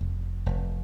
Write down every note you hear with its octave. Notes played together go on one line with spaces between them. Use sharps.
F1
F1